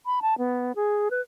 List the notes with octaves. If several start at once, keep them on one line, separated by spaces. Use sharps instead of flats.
B5
A5
B3
G#4
B4